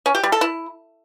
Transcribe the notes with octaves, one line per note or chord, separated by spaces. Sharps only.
C#4
G4
G3
A4
E4